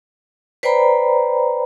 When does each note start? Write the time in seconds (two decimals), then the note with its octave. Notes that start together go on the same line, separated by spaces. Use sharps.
0.63 B4 C5 D5 G5 A#5 B5